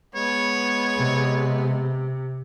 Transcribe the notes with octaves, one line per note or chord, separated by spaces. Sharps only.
G#3 B3 C#5
C3